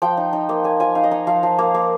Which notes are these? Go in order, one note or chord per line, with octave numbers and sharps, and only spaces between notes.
F3 G5
D#4
D#4
A#3
A#3 G#5
F3 G#5
D#4 F5
D#5
D#4 F5
F3 F5
F3
A#3
A#3